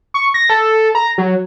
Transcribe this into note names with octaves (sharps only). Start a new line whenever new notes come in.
C#6
A#6
A4
A#5
F#3